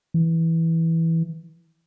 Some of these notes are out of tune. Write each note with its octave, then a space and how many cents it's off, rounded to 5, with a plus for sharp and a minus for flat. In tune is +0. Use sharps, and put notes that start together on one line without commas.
E3 -10